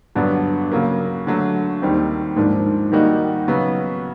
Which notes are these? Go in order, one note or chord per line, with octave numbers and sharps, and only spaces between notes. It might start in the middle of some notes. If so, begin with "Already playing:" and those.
G2 D3 F#3 B3 D4
C#3 F#3 A#3
D3 F#3 A3
D#2 D#3 G3 C4
G#2 F3 A#3 D4
D#3 G3 A#3 D#4 F#4
C#3 F#3 B3